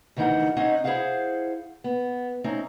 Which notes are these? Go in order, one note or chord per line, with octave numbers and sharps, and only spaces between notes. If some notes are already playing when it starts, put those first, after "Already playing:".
D2 D#3 E3 D#4 A#4 F#5
C4 C#4 D#4 D#5 F#5
E4 G#4 A4 C5 F5 F#5
B3
A3 C4 C#4 D#4